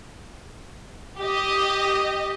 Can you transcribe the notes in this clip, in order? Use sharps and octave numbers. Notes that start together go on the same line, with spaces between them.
G4 D#5